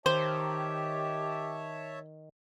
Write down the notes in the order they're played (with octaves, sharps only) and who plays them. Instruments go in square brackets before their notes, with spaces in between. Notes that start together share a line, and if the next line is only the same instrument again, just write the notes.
[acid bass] D#3 [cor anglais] G4 [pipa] C5 [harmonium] C#5 E5 A5